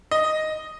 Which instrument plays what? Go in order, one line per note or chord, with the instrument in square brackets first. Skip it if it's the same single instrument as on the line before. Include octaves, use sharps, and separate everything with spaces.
[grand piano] D#5